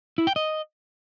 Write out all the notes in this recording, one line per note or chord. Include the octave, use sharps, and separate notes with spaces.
E4
G5
D#5